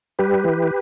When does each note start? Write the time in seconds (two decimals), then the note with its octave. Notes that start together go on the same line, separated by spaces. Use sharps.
0.19 G3 G4 B4
0.44 E3